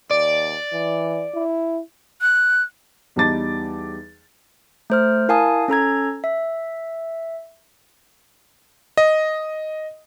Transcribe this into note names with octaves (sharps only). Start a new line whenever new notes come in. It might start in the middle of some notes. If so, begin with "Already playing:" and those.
D#2 D5
E3
E4
F#6
E2 G3 D#4 A5 D6 A6
A3 C5 F6
E4 A#4 F5 G#5 A5 D#6
C#4 A4 A#5 G#6
E5
D#5